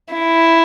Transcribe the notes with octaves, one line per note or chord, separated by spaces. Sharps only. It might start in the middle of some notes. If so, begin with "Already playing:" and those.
E4